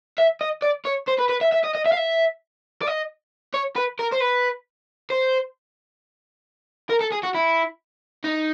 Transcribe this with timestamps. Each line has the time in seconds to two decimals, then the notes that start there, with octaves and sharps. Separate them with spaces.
0.18 E5
0.41 D#5
0.62 D5
0.85 C#5
1.08 C5
1.19 B4
1.29 B4
1.41 E5
1.52 E5
1.64 D#5
1.75 D#5
1.86 E5
1.92 F5
1.97 E5
2.82 D5
2.87 D#5
3.54 C#5
3.76 B4
3.99 A#4
4.12 C5
4.20 B4
5.10 C5
6.90 A#4
7.01 A4
7.12 G#4
7.23 F#4
7.34 E4
8.24 D#4